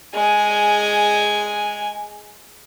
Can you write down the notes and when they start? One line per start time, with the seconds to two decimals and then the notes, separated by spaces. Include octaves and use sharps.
0.14 G#3 G#5